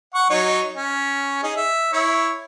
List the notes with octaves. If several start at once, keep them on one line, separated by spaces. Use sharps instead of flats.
F#5 C#6
F#3 D#4 C#5
C#4
D#4 G#4
E5
E4 C#5 E5